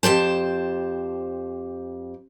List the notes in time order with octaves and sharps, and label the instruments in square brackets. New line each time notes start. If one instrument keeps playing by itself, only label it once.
[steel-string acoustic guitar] F2 G4 C5 A5